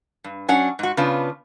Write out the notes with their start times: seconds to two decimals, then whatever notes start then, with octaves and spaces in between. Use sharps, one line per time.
0.24 G2
0.48 F#3 C#4 D4 F#5
0.79 G#2 F#4
0.97 C#3 B3 D4 F4